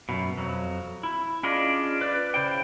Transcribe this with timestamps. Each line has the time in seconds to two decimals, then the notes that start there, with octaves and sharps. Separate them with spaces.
0.09 F#2 B2
0.38 F2 F#3
1.03 E4
1.43 C#4 D4 F4 G#4 D5 D#5
2.01 B4 D5
2.34 C#3 E4 C5 G5